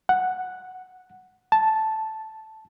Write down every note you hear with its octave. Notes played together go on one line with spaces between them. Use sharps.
F#5
A5